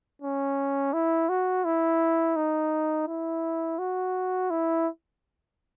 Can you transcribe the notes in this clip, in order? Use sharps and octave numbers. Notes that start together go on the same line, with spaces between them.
C#4
E4
F#4
E4
D#4
E4
F#4
E4